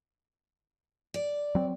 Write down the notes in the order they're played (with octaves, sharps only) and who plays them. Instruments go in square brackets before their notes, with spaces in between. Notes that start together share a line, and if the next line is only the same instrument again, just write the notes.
[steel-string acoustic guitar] D5
[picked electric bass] F#3 C4